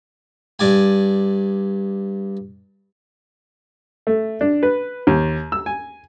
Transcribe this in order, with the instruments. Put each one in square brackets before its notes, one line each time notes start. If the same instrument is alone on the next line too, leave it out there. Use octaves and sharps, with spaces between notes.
[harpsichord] G2 D5 G#5
[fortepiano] A3
D4
B4
D#2
E6
G#5